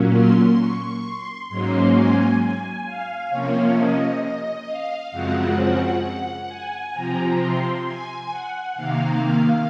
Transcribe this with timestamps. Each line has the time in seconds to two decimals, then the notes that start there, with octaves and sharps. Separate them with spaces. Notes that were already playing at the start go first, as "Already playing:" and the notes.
Already playing: A#2 F#3 A#3 C#4
0.12 C6
0.58 C#6
1.03 C6
1.49 G#2 F#3 A#3 C#4
1.94 G#5
2.39 G#5
2.85 F5
3.30 C3 F3 A#3 C#4 C#5
3.76 D#5
4.21 D#5
4.66 F5
5.12 F#2 C#3 F3 G#3 C4 F#5
6.48 G#5
6.94 C3 F3 C4 A#5
7.39 C6
7.84 G#5
8.30 F#5
8.75 C3 D#3 A#3 F5